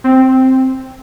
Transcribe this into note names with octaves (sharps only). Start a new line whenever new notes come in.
C4